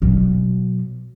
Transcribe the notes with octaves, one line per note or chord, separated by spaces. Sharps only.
B2 F#3